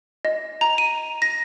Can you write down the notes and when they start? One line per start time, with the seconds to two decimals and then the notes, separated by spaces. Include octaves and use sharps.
0.25 D#5
0.61 A#5
0.78 D#7
1.22 A#6